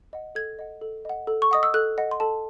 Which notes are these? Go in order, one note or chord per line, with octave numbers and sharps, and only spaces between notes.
D#5 F#5
A4 G#6
D#5 F#5
A4
D#5 F#5
A4
C#6
D#5 F#5 D#6
E6
A4 F#6
D#5 F#5
C6
A4 A5